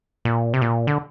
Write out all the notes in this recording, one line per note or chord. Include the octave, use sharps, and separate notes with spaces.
A#2
C3
A#2
D3